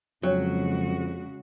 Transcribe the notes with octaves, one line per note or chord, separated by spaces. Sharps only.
F2 C#3 F#3 G#3 D4 F#4 C#5